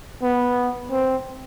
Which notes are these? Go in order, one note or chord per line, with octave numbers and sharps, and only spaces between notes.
B3
C4